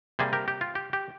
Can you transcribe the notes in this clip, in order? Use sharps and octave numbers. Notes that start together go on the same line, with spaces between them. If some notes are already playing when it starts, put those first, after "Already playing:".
C3 G3 A#3 G#4 C5
G4 A#4
G4
F4
G4
G4